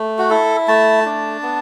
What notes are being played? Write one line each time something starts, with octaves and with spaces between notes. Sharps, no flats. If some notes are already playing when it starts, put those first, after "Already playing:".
Already playing: A3
F#4
E4 A4
A3 A5
D4
B3